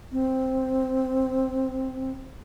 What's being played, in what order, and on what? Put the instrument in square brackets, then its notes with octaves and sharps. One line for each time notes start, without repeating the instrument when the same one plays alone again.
[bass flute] C4